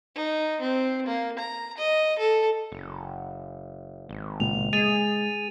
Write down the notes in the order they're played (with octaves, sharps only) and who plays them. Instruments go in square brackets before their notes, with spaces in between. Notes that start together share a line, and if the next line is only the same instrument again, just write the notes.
[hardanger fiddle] D#4
C4
A#3
A#5
D#5
A4
[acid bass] F#1
G#1
[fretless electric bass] C#2 A#2 [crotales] F7
[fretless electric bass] G#3 [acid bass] G#4 [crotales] A6 D#7 F7